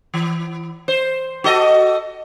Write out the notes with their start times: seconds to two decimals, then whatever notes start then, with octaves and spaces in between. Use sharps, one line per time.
0.14 E3
0.88 C5
1.44 F#4 A4 D#5